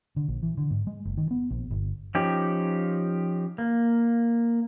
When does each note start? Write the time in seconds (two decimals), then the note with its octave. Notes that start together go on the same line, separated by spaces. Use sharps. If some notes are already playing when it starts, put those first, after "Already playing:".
0.16 D3
0.28 A#1
0.42 E3
0.58 D3
0.70 G#2
0.87 G#3
1.05 F#1
1.17 D#3
1.31 B3
1.51 A#1
1.71 G1
2.15 F3 C#4 D#4 G4
3.58 A#3